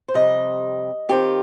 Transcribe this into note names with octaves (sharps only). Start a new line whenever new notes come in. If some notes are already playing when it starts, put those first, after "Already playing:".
C5
F2 C3 G3 D#5
D#3 C4 F4 G4